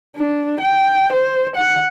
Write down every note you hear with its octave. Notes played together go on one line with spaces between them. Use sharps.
D4
G5
C5
F#5